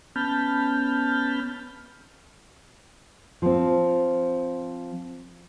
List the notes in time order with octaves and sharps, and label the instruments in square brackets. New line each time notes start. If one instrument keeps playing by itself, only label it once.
[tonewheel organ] B3 C#4 A5 B5 F6 G6
[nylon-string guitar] F3 C4